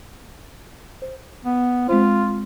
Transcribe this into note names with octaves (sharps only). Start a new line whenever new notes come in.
C5
B3
G#3 C4 F4 C5